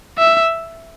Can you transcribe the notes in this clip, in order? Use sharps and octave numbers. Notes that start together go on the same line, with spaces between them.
E5